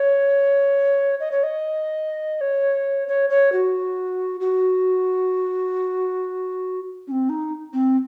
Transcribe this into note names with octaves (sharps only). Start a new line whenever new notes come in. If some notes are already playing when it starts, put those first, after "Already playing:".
Already playing: C#5
D#5
C#5
D#5
C#5
C#5
C#5
F#4
F#4
C#4
C4
D#4
C4